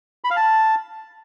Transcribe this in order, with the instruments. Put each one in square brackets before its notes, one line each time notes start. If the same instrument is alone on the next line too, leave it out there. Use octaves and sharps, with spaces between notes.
[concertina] B5
F5
A5